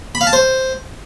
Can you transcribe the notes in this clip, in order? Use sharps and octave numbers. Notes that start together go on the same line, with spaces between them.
B5
F5
A5
C5